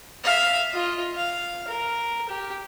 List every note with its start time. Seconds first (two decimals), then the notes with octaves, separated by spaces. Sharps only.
0.24 E5 F5
0.73 F4 D#5
1.15 F5
1.68 A#4
2.29 G4